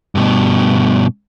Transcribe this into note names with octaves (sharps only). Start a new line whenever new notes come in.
G2 B2